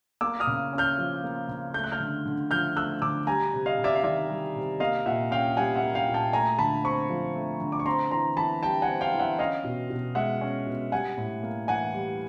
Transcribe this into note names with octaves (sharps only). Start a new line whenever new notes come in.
A#3 D6 E6
D#6 F6
C#3
C#4
F6 G6
F3
A#3
C#3
A3 G6
F#6
F6 G6
D3
D3
F3 F6 G6
A3 E6 F#6
D3 D6 E6
G3 G#5 A#5
C3
D#5 F5
C3
D5 E5
F5
D#3 D5 E5
G3
C3
A#3 D#5 F5
A#2 E5 F#5
C#4 F5 G5
G3 F#5 G#5
E5 F#5
A#3
F5 G5
A#2
G5 A5
A3 G#5 A#5
D3 A5 B5
C4 B5 C#6
F3
A3
D3
D6
C#6
C4 A#5 C6
E3 A#5 C6
E3 A5 B5
G3 G5 A5
F#5 G#5
C4
F5 G5
E3
E5 F#5
C#4 D#5 F5
B2
B2
G#3 E5 F#5
C#4
B2
G3 F#5 G#5
A2
A#3
E3 F#5 G#5
G3